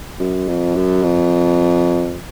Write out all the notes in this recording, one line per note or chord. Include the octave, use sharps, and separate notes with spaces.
F#2
F2
F#2
F2